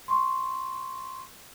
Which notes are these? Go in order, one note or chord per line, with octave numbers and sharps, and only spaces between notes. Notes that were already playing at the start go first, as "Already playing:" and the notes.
C6 C#6